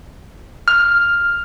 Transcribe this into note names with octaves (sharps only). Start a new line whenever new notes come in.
F6